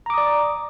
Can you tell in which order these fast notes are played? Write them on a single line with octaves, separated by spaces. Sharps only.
A#5 D6 D#6 D5